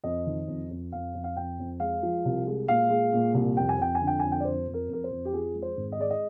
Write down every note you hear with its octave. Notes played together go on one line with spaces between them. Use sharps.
F2 D#5
D#3
F2
F2
F2 F5
F2
F5
F2 G5
F2
G#3 F5
F3
C2
G#3
A#2 F5
G#3
A#2
C2
F2 G5
G#5
F2 G5
G#5
D3
G5
F2 G#5
G5
D5
F2 C5
F2
A#4
F2 A#4
C5
F2
G4
F3 G#4
G#3
C5
G#1
D#5
G#3 D5
D#5